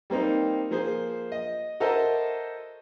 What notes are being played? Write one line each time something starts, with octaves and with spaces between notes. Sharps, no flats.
G3 A#3 C4 D#4
F3 A#3 G#4 C5
D#5
F#4 A4 A#4 C5 D#5 E5